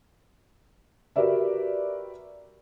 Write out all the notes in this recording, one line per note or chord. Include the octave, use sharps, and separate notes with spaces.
F#4 G4 A#4 B4 D5 E5